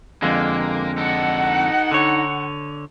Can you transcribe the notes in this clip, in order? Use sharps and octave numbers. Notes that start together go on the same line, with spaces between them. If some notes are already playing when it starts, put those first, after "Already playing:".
F2 D3 G#3 A#3
D#4 A4 F#5
D3 C#5